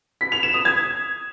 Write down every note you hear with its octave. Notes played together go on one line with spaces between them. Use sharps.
B6
F7
E7
D#6
G#6